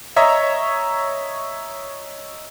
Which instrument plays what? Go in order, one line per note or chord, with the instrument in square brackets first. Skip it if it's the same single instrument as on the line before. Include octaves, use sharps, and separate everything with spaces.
[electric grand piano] C#5 D#5 E5 A#5 C#6